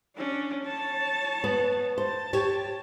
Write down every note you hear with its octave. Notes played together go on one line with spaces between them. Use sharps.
C#4 D4
C#5 A5
B3
C5 A5
G4 C#5